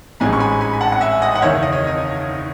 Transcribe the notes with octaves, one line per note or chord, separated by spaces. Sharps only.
A1 G#2 E3 G#3 C#4 G#5 B5
C#6
G#5 B5
G#5 B5
B5
F#5 A5
F#5
E5 G#5
D#5 F#5
F#5
F#1 E2 D#3 C#5 E5
D#5
C#5
D#5